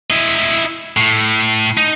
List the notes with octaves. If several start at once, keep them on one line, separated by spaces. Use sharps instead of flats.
E4 D#5
A2
D#4